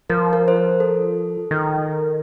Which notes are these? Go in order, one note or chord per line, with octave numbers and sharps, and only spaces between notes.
F3 A#4
A#4
C5
A#4
A4
D#3